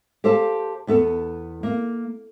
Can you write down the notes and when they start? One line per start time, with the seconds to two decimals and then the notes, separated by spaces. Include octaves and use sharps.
0.24 G4 A4 C5 F5 A5
0.87 E2 B3 A4
1.63 A#3